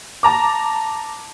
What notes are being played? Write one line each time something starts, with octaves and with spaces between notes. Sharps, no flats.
A5 A#5 D6